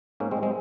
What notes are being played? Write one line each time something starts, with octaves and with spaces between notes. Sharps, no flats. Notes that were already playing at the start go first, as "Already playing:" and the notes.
G#2 A#3 C#4
G#3 C4
G3
G#3 C4